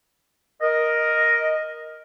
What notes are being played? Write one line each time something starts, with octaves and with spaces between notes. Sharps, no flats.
A#4 D#5